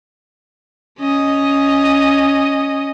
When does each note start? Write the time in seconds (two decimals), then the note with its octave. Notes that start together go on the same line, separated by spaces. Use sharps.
1.00 C#4 D#5